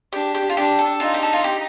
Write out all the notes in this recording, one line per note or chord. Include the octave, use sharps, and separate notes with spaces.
D4 G4
G4
F4
D4 G4
A4
D#4 F4
G4
A4
F4
G4